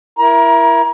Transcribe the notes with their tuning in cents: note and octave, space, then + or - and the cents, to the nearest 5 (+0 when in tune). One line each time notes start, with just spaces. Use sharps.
E4 +15 A#4 +15 A#5 +30